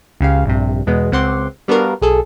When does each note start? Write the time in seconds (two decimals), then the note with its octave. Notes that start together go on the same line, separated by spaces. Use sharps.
0.21 C#2 C#3 G4 F5
0.45 A#1 G2 C3
0.86 E2 B2 G#3 B3
1.12 C#2 C4 F#5 C6 D6
1.68 G3 B3 D4 F#4 A#4 F5
2.02 B1 G#4 A4